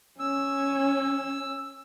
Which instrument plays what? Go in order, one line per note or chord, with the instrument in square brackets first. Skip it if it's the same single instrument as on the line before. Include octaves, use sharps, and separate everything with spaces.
[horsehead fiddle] C#4 [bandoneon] E6